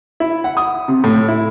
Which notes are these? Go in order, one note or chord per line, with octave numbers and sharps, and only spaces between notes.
E4
F#5
D#6
C3
A2
E4